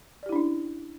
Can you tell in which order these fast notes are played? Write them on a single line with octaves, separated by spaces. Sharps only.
D5 G4 E4 D4 C#4